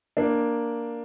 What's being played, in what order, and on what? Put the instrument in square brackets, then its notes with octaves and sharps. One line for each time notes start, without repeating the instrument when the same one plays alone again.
[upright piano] A#3 D4